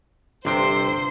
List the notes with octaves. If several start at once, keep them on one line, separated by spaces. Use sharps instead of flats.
G1 G2 C3 C5 G5 C6